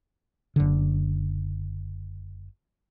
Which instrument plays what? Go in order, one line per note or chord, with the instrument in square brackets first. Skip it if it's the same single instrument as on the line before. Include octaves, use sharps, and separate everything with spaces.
[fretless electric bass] F#1 D3